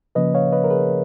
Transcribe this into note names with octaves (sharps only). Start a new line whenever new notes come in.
C#3 F3 A#3 C#4 B4 D#5
C#5 F5
B4 D#5
A#4
G#4 B4